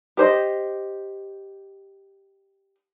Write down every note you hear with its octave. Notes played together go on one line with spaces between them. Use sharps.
G4 C5 D#5